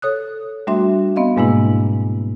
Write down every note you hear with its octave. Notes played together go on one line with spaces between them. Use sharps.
A4 C#5 D#6 F#6
G3 A3 D4 F#4 E5 C6
B3 C4 D#5 F5
G#2 B2 G#3 A#3 D4 E4